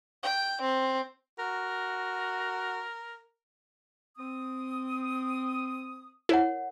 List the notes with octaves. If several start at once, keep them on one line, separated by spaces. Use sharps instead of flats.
G5
C4
F#4 A#4
C4 D#6
E4 A#4 C#5 F#5